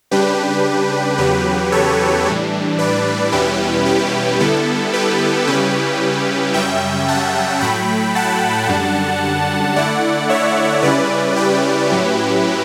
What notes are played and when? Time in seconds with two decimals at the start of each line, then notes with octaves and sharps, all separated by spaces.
0.11 C#3 G3 D4 G4 B4
1.18 E2 C#3 F#3 G4 B4
1.72 A4 C#5
2.26 A2 E3 G3 D4
2.79 B4 D5
3.32 E2 B2 G3 C#4 E4 G4 B4
3.86 G4
4.40 D3 G3 B3 E4 A4
4.93 G4 B4
5.47 C#3 G3 C#4 E4 G4 B4
6.54 F#2 C#3 G3 C#4 E5 G5
7.08 F#5 A5
7.61 A2 F#3 A3 G5 B5
8.15 F#5 A5
8.68 F#2 D3 G3 D4
9.76 D3 A3 E4 D5 F#5
10.29 C#5 E5
10.83 C#3 G3 C#4 E4 B4 D5
11.36 G4 B4
11.90 A2 F#3 C#4 E4